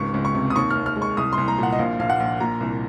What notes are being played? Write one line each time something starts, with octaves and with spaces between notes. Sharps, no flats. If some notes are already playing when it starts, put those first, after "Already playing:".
Already playing: G#1 C#2 C#6
C#2
C#6
C3
D#6
D#2 C#6
F6
D#2
F6
G#3
C#6
C2 D#6
C6
C2
A#5
A#2 F#5
D#5
A#1 F5
A#1 F5
F#5
A#1
A#2 A#5
C2